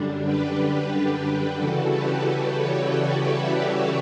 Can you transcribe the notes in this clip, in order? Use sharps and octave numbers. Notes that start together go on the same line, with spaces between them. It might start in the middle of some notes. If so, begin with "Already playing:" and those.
Already playing: F#2 D3 G3 D4
G4 B4
G4 B4
C#3 E3 G3 F#4 A4
G4 B4
G4 B4
A4 C#5
B4 D5
C#5 E5
C#5 E5